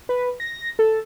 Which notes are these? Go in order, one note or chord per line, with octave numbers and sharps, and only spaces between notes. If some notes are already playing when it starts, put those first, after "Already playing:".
B4
A#6
A4